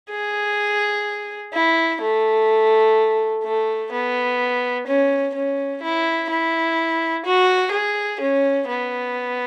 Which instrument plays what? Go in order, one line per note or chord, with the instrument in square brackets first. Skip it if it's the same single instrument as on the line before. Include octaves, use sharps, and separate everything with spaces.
[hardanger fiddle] G#4
E4
A3
A3
B3
C#4
C#4
E4
E4
F#4
G#4
C#4
B3